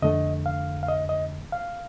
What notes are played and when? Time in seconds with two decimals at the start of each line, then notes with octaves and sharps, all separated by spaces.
0.02 F2 D3 A3 D#5
0.46 F5
0.83 F5
0.88 D#5
1.09 D#5
1.52 F5